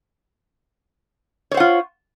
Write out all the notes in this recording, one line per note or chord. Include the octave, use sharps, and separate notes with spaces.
F4 C5 C#5 F#5